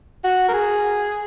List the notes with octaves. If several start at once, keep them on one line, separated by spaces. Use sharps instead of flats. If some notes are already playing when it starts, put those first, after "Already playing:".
F#4
A#4
G#4